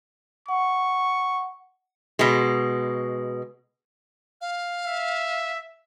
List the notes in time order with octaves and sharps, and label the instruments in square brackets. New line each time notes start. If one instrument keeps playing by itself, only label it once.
[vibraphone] F#5 [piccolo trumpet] C#6
[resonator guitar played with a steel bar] B2 G#3
[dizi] F5
[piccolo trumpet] E5